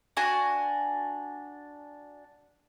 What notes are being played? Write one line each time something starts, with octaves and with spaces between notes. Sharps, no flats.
D4 F#4 G#5